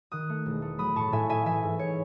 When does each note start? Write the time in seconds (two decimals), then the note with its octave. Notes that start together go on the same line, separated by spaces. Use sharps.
0.12 D#3 D#6 F#6
0.29 A3
0.46 E1
0.62 A3
0.79 F#3 B5 D#6
0.96 A2 A5 C#6
1.12 A2 E5 G#5
1.29 E4 E5 G#5
1.45 E3 E5 G#5
1.63 G#2
1.79 C#5